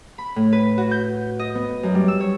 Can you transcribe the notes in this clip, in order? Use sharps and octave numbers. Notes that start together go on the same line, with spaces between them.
B5
A2
B4
F#4
G6
D#5
B3
F#2
G3
E6
C#5